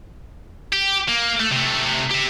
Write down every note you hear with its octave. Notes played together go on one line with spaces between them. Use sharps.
G4
A#3
A3
C3 A3
G4 E5